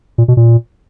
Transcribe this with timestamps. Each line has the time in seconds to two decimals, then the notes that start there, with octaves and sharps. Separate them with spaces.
0.18 A#2
0.28 B2
0.37 A#2